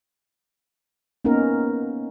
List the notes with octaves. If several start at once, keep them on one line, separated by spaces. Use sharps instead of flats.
A#3 B3 C#4 D#4 A#4